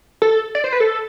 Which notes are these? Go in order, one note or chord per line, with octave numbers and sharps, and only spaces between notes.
A4
D5
C5
B4
A4